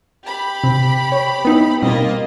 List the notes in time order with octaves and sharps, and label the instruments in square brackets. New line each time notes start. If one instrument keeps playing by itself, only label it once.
[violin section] G4 B5
[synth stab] C3
C#5
B3 D#4 E4
[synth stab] B2 G3 C4 [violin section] A#3 F4 D#5